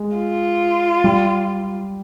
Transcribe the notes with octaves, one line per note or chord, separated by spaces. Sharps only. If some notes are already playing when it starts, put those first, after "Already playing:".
Already playing: G#3
F4
G3